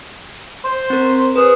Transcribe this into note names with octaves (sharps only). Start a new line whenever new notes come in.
C5
C4 A#4
G#4 B4 C5